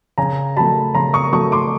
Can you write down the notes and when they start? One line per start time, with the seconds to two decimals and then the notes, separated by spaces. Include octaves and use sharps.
0.18 C#3 G#5 A#5
0.57 F#3 A3 A5 B5
0.94 C#3 A#5 C6
1.13 C#6 D#6
1.33 F#3 A3 C#6 D#6
1.52 C6 D6